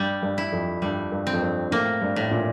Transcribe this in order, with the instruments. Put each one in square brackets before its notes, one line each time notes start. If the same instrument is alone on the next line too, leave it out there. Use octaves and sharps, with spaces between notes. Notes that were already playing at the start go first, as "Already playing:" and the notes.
Already playing: [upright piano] G2 [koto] G3
[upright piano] G2
[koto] E4
[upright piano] F2
[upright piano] G2 [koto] G3
[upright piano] G2
[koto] C4
[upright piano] F2
G2
[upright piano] A2 [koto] A#3
[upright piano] G2
[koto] A2
[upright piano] A#2